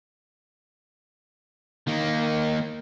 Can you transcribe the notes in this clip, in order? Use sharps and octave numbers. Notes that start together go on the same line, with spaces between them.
D#3 A#3